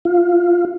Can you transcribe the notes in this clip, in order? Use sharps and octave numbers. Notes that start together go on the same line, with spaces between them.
F4